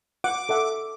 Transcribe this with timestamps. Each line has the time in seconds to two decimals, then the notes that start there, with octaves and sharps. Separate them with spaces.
0.24 F#5 D6
0.49 A4 E5 F#5